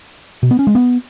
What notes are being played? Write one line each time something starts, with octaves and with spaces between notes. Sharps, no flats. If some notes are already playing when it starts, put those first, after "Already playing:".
B2
B3
C#4
G#3
B3